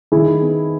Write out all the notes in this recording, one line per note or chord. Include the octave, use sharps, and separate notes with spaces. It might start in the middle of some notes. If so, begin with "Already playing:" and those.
D#3 E4 G#4
B3